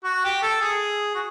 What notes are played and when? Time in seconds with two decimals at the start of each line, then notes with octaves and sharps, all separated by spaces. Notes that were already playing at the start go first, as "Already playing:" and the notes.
0.04 F#4
0.24 G4
0.42 A4
0.61 G#4
1.15 F#4